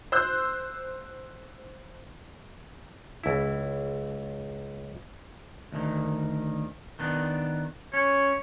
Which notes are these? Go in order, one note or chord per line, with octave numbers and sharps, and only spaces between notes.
C5 C6 E6 F#6 G6
C#2 E4
D2 D#3
D#3 B3 D4
C#4 C#5